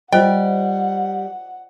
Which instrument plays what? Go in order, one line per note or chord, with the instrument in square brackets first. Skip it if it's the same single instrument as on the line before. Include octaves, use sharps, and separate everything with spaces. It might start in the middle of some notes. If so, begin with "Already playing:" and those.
[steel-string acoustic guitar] G3 [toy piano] F4 C5 D#5 [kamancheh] F#5 [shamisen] G5